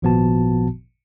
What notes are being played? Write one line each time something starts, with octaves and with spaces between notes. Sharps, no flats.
G#1 A#2 F3 B3 F#4 A5